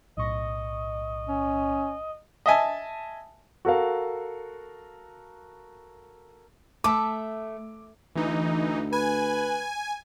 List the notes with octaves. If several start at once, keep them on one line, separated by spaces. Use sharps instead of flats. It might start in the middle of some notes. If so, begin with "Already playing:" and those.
B1 A2 D#5 C#6
C#4
D#5 E5 G#5 A5
F#4 A4 A#4 F5
A3 E5 A5 B5 D6
D2 E3 D#4
B4 G#5